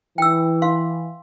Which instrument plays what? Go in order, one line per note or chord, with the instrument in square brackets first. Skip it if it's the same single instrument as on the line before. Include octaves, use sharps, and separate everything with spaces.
[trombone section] E3 [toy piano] G5 E6
[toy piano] F5 C6